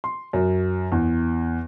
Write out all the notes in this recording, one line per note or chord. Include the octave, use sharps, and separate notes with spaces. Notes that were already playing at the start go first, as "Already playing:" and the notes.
C6
F#2
E2